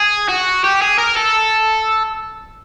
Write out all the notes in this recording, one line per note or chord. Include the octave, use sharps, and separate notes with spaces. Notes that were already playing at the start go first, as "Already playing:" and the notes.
Already playing: G#4
F#4
G4
G#4
A#4
A4